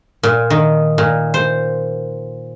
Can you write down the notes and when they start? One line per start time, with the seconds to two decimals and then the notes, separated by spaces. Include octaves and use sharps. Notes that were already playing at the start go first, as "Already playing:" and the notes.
0.23 A#2
0.50 D#3
0.98 A#2
1.34 C5